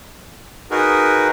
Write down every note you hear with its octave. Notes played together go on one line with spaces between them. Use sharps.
D#4 F#4 G#4 A#4 B4